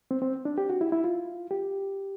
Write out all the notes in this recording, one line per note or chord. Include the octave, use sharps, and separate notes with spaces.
C4
C4
D4
G4
F#4
E4
E4
F4
G4